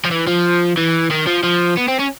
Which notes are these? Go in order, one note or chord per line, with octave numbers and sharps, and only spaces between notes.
F3
E3
F3
E3
D#3
F3
F3
B3
C4
C#4